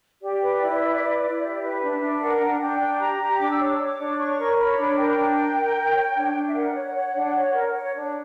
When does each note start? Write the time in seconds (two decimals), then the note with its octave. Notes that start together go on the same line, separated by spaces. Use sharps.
0.22 G4 D5
0.42 B4
0.62 E4
0.83 B4
1.01 B4
1.21 E4
1.41 G4
1.61 B4
1.81 D4 E5
2.00 D4
2.20 A#4 F#5
2.40 D4
2.60 D4 G5
2.79 D4
2.99 G4 A#5
3.19 G4
3.39 D4 D6
3.51 E6
3.59 C#5 D6
3.73 E6
3.78 C#5
3.85 D6
3.98 D4
4.18 C#5 C#6
4.38 A#4
4.58 C#5 B5
4.77 D4
4.97 A#4 G5
5.17 D4
5.37 A#4
5.56 A#4
5.76 A#4
5.95 C#5
6.16 D4
6.35 D4
6.47 E5
6.55 A#4 F#5
6.75 C#5
6.94 C#5
7.15 D4
7.35 C#5
7.53 A#4
7.74 C#5
7.94 D4